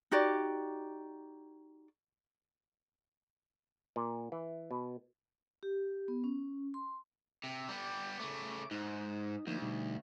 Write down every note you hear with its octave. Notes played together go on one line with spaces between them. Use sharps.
D#4 F#4 G4 D5
A#2
E3
B2
G4
B3
C#4
C6
C3
G3 B3 D6
C#3 A3
G#2 D#4
D2 F3 A#3 D#4
B2 G3 D#4